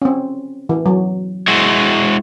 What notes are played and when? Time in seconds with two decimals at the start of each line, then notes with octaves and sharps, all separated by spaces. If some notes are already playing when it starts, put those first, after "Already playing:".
0.02 C4 C#4
0.69 E3
0.86 F#3
1.48 G#3 E4 F#4